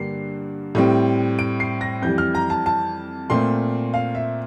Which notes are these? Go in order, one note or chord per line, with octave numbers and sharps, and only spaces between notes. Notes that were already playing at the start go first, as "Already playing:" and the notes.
Already playing: G2 D3 G3 A#3 C7
A2 G3 C4
D7
C7
A#6
F2 E3 G3 G6
F6
A#5
A5
A5
A#2 A3 C4 C6
F5
E5